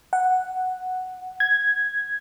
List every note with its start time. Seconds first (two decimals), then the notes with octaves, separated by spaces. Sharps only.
0.13 F#5
1.40 G#6